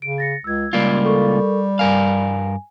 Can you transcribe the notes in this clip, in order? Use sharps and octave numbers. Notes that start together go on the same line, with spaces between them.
C#3 D7
A6 A#6 C#7
C#2 E6 G#6
C#2 G3 A#3 F4
A4 A#4 C#6
G2 A#4 F5 G#5